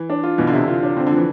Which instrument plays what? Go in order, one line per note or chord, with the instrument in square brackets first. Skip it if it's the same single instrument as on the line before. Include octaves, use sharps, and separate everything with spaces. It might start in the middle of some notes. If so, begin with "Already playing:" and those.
Already playing: [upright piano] E3
[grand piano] D4
F4
[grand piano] B2 [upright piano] E3
[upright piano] D3
[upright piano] C3 [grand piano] E4
[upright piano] D3 [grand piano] F4
[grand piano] D4
[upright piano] D3 [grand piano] C4
[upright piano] D3
[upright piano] E3 [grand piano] F3